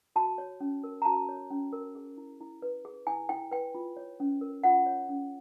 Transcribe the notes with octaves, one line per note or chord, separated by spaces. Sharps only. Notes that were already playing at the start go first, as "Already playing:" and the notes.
F#4 A5
C#5
C#4
A#4
A#5
F#4 A5
C#5
C#4
A#4
G#4
E4
E4
B4
G#4
E4 G#5
E4 G5
B4 G5
F4
C#5
C#4
A#4
F4 F#5
C#5
C#4